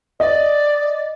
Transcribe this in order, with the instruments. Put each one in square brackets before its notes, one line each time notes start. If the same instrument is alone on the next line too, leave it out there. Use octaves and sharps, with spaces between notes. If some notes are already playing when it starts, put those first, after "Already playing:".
[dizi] D5 [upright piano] D#5